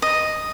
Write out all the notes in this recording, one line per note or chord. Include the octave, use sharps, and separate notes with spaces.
D#5